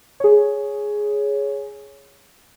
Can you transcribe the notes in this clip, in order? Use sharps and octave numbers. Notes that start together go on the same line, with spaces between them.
G#4 C#5